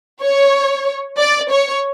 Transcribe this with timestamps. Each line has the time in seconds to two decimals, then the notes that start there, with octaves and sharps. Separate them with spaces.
0.21 C#5
1.18 D5
1.51 C#5